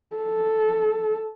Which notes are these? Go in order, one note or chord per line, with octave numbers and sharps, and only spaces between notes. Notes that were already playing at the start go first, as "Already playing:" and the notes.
A4